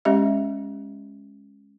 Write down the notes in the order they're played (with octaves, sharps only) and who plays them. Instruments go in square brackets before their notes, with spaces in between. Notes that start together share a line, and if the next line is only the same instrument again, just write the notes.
[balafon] G#3 C#4 G4 D#5 E5